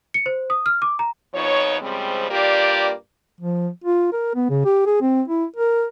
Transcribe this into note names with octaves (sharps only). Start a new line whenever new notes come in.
C#7
C5
D#6
F6
D6
A#5
F2 B2 F3 D#4 C#5
C#3 F3 G3 G#3 C4
G2 A#3 F4 G4 D5
F3
F4
A#4
B3
C#3
G4
G#4
C4
E4
A#4